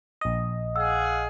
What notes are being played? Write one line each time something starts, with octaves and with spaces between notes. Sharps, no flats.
A#1 D#5
G#4 F5 F#5 E6